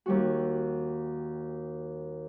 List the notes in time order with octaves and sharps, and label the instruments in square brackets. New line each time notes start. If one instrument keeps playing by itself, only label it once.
[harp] D#2 G3 F#4